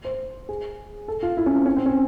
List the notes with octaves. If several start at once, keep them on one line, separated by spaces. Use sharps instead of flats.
C5
G#4
A4
F4
E4
C#4
C4
C#4
C4
C#4